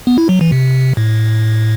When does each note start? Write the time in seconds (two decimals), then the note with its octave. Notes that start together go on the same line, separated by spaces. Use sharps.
0.07 B3
0.18 E4
0.29 F#3
0.41 E3
0.52 C3
0.97 A2